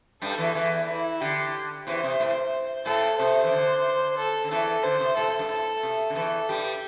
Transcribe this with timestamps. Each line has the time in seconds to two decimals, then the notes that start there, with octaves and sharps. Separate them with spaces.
0.22 G2 G3 A4
0.38 E2 E3
0.55 E2 E3
0.89 E4
1.21 D3 G4
1.87 E2 E3 C5
2.04 C3
2.20 A2
2.86 A2 A4
3.18 C3 C5
3.44 E3
3.51 D3
4.17 A4
4.44 D3
4.50 E2 E3 A4
4.83 D3 C5
5.00 C3
5.16 A2 A4
5.28 A2
5.39 G2
5.49 A2 A4
5.83 C3
6.10 D3
6.15 E2 E3 A4
6.49 G2 G3 G4